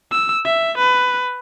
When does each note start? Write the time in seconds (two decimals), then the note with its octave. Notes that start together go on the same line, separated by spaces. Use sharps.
0.12 E6
0.45 E5
0.78 B4